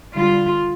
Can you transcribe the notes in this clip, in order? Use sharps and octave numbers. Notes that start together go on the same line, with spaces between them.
D3 G3 F4